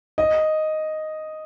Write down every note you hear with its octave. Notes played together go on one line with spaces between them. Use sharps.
D#5